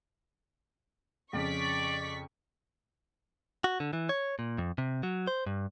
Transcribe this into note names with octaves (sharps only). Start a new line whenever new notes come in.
F2 C#3 D5 C#6 B6
F#4
D3
E3
C#5
A#2
F2
C3
F#3
C5
G2